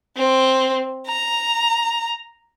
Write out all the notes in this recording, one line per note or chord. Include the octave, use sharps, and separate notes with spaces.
C4
A#5